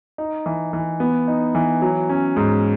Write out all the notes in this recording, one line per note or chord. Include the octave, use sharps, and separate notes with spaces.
D#4
E3
E3
B3
D#4
E3
F#3
C#4
G#2